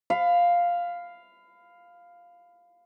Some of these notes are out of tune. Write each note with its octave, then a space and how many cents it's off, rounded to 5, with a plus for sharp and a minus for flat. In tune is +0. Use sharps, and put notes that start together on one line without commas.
F5 +0 B5 +30